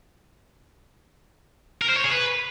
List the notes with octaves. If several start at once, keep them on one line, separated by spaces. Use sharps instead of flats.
A#4
C5
C#5
G#4
B4